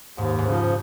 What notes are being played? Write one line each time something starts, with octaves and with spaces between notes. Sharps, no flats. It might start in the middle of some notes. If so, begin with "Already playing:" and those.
D#2 G#2
G#2
C#3 F3